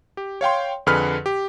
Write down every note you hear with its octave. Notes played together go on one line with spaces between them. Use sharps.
G4
C#5 F5 G5 C6
F2 D3 G#4 B4 B5 F6
G4